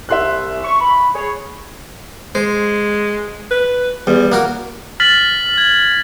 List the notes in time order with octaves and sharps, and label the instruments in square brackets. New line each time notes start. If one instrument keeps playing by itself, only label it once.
[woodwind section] C2 [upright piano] E5 C6 F#6
[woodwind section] C#6
B5
G#4 C#5
[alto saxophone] G#3 [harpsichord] C5
[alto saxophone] B4
[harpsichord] E2 [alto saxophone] G3
[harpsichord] A#3 F#4 A#4
[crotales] F6 A6 B6 F#7
G#6